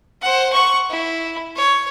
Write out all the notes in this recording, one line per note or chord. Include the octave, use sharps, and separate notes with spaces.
C5 F#5
F#5 C#6
E4
C#5